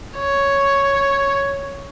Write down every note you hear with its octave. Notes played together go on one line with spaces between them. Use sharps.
C#5